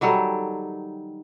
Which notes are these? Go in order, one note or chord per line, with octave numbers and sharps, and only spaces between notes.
D#3 F#3 G3 A4